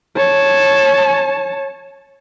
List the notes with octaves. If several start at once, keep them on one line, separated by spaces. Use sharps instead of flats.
C#5 A5